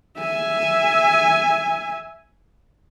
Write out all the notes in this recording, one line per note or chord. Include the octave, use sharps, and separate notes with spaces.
E5 G#5